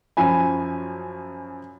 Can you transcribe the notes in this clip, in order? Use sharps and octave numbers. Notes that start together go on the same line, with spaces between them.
F#2 F3 G#5 B5